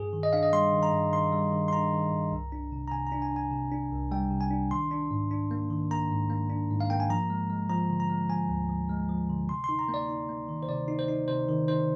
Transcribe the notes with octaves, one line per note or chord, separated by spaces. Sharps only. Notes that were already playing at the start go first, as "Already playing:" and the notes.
Already playing: G2 G#4
D#3
D#5
D4 F5
D#5
G3 C6
D#3
A#5
G2
D#3 C6
G3
D#3
C6
D4 A#5
D#3
G2
C2
D4
C3
A#5
C3 G#5
A#5
D4
G#5
D4 G#5
C3
D4
C2
G3 G5
C3
G#5
D4
D#3 C6
D4
G#2
D4
A#3
D#3
A#3 A#5
G#2
A#3
D4
G#2
F5
A#3 G5
G#5
F3 A#5
G#3
G#3
F3 A#5
D3
A#5
G#3
F3 G#5
D2
F3
G#3
F3
D3
C3 C6
D#4 C6
A#5
A#3
D5
D#4
A#3
D#3
C5
C3 D5
D#4
C5
D#4
C3 C5
D#3
D#4 C5